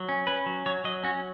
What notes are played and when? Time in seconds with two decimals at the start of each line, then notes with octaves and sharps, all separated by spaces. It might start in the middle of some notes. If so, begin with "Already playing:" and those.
Already playing: F#3
0.09 C#4
0.27 C#4 B4
0.46 F#3
0.66 F#3 C#5
0.84 F#3 D#5
1.03 C#4 F#4